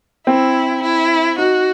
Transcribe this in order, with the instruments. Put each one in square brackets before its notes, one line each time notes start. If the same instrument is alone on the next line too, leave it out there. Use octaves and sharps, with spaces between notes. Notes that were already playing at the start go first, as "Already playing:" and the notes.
[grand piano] C4 [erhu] E4
[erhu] E4
[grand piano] D#4 [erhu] F#4